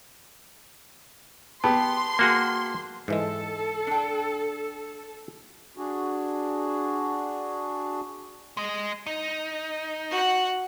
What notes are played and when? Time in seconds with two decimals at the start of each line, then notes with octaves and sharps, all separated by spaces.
1.64 B3 G4 A5 C6
2.19 A#3 F#4 G#4
3.08 G#2 E3 G#3 A4
3.87 D4 G5
5.77 D4 F#4 G#4
8.57 G#3 D#5
9.06 D#4
10.11 F#4 F#5